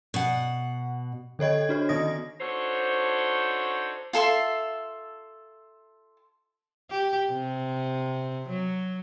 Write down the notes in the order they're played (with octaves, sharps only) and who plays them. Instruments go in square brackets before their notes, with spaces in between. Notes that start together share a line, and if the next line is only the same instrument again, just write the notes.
[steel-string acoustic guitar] B2 F#5
[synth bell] D3 A4 C#5 D#5 G#6
D4 F#4 C#5
D#3 B3 D#4 D#5 D#6 A#6
[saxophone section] D4 D#4 F#4 A4 C5 C#5
[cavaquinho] F4 A4 E5 C6
[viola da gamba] G4
C3
F#3